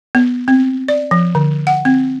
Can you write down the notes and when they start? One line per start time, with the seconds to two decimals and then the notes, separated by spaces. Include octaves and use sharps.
0.15 B3
0.48 C4
0.88 D5
1.11 F3
1.35 D3
1.67 F#5
1.85 C4